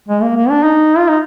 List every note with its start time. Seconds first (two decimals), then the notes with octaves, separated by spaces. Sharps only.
0.09 G#3
0.23 A#3
0.36 A#3
0.50 D4
0.64 D#4
0.98 F4
1.09 D#4